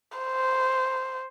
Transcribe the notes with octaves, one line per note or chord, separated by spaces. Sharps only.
C5